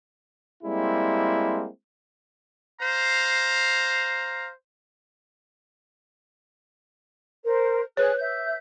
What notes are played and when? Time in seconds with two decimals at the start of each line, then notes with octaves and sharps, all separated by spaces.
0.63 G3 G#3 A#3 C4 E4
2.82 C5 F5 A#5
7.44 A#4 C5
7.97 G#4 B4 C#5 F#6
8.19 E5 G6